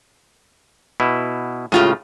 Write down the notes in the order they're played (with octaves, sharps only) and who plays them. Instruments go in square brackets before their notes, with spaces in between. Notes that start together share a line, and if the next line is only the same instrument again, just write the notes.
[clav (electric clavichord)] B2 E4
[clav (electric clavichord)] A2 C#3 [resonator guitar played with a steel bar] G#3 F4 G4